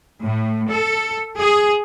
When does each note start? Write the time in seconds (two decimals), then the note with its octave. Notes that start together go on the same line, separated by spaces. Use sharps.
0.25 A2
0.73 A4
1.40 G#4